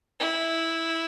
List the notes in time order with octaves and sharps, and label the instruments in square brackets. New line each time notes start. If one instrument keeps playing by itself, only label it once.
[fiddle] E4